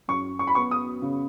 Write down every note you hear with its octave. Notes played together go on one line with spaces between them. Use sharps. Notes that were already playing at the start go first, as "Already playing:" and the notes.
F#2 C#6
C#6
B5
B3 C#6
D#6
C#3